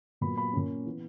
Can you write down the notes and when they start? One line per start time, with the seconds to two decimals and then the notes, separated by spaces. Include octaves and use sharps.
0.21 A#2 F#3 B3 B5
0.37 B5
0.53 A#2 A#3 C#4
0.86 E3 B3